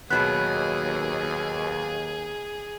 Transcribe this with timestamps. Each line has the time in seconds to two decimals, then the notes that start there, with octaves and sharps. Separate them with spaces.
0.10 D#2 B2 F#3 B3 G#4 F#6